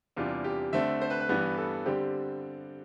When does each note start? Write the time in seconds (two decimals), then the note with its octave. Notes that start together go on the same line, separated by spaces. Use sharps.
0.16 E2 C3 G3 D4 F4
0.44 G4
0.73 D3 A3 C4 E5
1.02 C5
1.10 B4
1.20 B4
1.29 G2 E3 G3 B3
1.58 A4
1.86 D3 G3 C4 G4